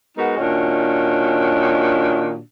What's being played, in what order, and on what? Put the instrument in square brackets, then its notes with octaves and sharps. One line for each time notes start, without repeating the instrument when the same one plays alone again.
[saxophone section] G#3 B3 D#4 F#4 A#4
A#2 D#3 C#4 D4 F#4